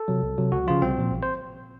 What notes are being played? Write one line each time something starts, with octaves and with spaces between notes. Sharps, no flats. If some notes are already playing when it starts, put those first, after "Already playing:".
Already playing: A4
C3 F#3
C2
C3 F#3
C#2 F#4
C#3 F3 F4
C2 C4
A#2 F3
A1
C5